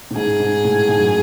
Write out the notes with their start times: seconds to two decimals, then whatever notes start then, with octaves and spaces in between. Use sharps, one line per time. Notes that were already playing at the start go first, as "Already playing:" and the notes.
0.11 A2
0.16 G#2 G#4
0.40 G#2
0.64 A2
0.88 G#2
0.97 F#2